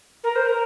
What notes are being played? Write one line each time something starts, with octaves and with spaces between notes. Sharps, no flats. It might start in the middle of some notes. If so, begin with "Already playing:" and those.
A#4
C5
A#4